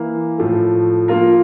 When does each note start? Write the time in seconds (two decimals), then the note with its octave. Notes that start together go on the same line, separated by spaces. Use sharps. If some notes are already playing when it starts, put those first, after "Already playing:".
Already playing: E3 A#3 E4
0.37 A2 F3 A3
1.08 F3 A#3 F4 A#4